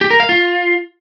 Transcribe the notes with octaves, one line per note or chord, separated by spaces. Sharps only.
G4
A#4
F5
F4